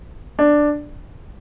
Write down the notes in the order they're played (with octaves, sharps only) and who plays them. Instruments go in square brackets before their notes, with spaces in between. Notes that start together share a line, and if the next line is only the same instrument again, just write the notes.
[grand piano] D4